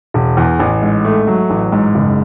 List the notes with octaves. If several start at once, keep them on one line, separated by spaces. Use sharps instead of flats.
E1
E2
A1
G#2
A3
F#3
A1
G#2
F#1